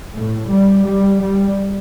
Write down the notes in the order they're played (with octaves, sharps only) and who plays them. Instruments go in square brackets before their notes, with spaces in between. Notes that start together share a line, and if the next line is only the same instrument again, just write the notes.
[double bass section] A2
G3
G3
G3